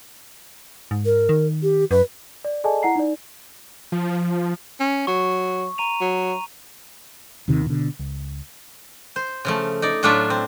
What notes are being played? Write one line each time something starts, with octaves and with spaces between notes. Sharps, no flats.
G#2
A#4
D#3
G4
F#2 B4
D5
G#4 A4 D5 D#5 G#5 A5
E4 F#5 A#5 C7
D#4 D5
F3
C#4
F#3 C#6
A#5 D#7 F7
F#3
D#2 C3 D#3
B2 D3
C#2
C5
C#3 F3 A3
D#4 D5
A2 F#3 A3 D4 F4 E5
C4